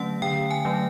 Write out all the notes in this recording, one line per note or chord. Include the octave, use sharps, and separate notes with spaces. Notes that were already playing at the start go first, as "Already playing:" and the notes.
Already playing: D3 F#3 A3 C#4 F#5
D3 G5
G#5
F#3 A3 C#4